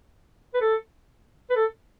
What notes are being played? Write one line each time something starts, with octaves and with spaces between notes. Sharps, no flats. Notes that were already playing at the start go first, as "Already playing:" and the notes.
B4
A4
B4
A4